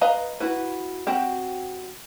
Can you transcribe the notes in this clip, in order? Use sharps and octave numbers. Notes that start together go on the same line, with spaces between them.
B4 D#5 F5 A#5
E4 F#4 B4
C4 F#4 G4